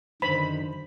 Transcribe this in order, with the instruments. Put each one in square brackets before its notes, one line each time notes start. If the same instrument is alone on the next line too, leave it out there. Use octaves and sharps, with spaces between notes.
[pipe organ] F#2 D3 D#3 [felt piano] C5 [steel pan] B5